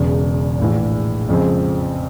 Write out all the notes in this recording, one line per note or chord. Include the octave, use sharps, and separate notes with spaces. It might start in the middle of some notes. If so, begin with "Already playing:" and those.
Already playing: E1 E2 C#3
A#1 A2 E3
F2 C#3 F3 G#3 C4